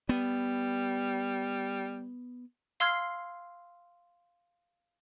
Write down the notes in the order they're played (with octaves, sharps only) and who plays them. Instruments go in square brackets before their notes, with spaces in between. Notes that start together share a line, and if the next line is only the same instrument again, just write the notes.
[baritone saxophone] G3 [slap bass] B3
[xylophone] F5 C6 E6 F6 G#6 C7